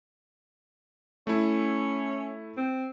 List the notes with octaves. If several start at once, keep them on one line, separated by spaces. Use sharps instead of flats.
A3 C#4 E4
C4